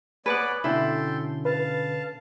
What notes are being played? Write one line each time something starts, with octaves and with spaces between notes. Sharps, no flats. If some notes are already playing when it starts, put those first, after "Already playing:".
B3 B4 C#5 D5 G#5 D6 F#6
B2 D3 C#4 E4 A4 G5 C6
B4 F5 A5